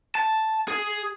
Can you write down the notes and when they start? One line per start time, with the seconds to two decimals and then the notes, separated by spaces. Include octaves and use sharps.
0.15 A5
0.68 G#4